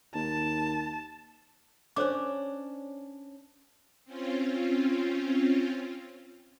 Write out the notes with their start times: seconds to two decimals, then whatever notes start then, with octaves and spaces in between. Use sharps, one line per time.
0.15 D#2 A5
1.96 C#4 D4 C5 C#5 D6
4.04 C4 C#4 F4